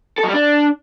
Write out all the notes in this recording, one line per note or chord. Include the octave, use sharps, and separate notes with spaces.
A4
F#3
G3
D4